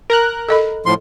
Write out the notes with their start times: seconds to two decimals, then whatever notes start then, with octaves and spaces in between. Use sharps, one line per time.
0.10 A#4 A#5 F#6
0.49 A4 D#5 B5
0.86 A2 F3 C6